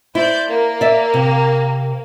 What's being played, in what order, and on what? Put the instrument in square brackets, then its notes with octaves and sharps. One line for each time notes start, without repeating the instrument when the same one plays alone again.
[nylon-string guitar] E4 [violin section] C5 D5 G6
[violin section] A#3
[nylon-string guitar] D5 E5
C3